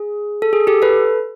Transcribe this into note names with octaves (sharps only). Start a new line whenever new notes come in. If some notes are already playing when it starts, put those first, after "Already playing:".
Already playing: G#4
A4
G#4
G4 A4
A4 B4